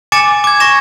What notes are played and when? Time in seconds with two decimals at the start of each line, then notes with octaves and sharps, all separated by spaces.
0.12 G#5 D6 A6 C#7 E7
0.44 D6 G#6
0.60 C#6 A#6 E7